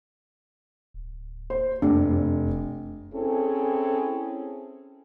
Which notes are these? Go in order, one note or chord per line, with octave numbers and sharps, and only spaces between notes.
D1
C5
F1 F#2 D4
E1
C4 C#4 E4 G#4 A4